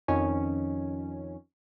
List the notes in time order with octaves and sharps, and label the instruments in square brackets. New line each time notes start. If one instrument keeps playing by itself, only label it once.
[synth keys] F2 D#3 C#4